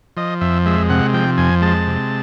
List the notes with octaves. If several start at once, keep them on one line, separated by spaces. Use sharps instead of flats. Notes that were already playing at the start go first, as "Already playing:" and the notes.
F3 D#5
F2 E5
G#3 E5
C3 F#5
F3 G5
F2 G#5
G#3 A5
C3